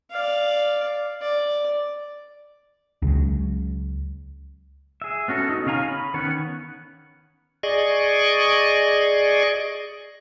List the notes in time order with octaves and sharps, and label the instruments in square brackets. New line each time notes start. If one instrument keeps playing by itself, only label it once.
[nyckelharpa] D5 F5
D5
[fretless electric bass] C#2 C#3 F#3
[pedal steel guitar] G#4 E5
B3 C#4 F#4 A4
D#4
C#3 C#4 F5 G#5 A#5
B5
D#3 B3 C#4 C#5 F#5
[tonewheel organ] G#4 D5 D#5 C#6